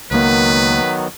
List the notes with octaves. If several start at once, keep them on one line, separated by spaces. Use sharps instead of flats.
C#2 D#3 F#3 A#3 B3 B4